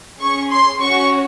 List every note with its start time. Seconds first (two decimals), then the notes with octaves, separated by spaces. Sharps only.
0.20 C#4 G#4 C#6
0.50 C6
0.81 C#4 F#4 C#6